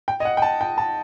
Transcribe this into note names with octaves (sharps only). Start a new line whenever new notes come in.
G5
D#5
F#5
G5
A5
G5
A5